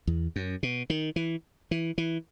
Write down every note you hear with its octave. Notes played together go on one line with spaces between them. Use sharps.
E2
F#2
B2
D#3
E3
E3
E3